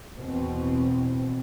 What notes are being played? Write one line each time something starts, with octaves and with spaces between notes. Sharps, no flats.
E2 B2 C4